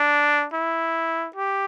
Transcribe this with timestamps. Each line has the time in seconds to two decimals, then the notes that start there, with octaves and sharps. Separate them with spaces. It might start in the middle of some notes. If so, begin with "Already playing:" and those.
Already playing: D4
0.54 E4
1.36 G4